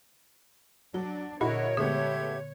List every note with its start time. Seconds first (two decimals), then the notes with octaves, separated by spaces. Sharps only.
0.94 F#3 D4
1.41 A#2 D3 E4 F#4 A#4 C#5 D#5
1.77 D3 G#3 A3 B3 G4 E5 G#6